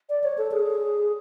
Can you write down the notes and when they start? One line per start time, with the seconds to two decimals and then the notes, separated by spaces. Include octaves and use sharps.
0.09 D5
0.23 C#5
0.38 A4
0.52 G#4